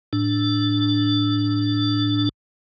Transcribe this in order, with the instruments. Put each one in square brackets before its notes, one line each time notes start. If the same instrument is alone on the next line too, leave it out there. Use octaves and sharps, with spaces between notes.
[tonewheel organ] A2 D4